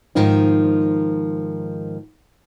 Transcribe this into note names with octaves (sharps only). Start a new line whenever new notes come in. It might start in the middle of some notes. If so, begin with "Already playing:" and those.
G#2 D#3 F3 D#4